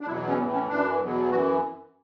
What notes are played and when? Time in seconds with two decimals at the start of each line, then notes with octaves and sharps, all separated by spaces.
0.01 D4
0.07 E2 B2 F#3 E4
0.28 C#4
0.38 A2 E3 B3
0.54 C#4
0.68 F#2 E3 D4
1.00 E2 B2 F#3
1.30 F#2 E3 F#4